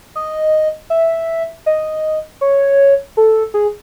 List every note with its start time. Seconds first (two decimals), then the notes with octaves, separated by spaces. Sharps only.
0.16 D#5
0.90 E5
1.66 D#5
2.41 C#5
3.17 A4
3.54 G#4